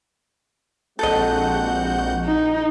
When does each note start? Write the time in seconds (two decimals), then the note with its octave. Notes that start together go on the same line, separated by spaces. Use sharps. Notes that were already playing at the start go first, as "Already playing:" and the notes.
0.99 A#1 G#3 C4 F#4 A4 D#5 F#5 G6
2.25 D#4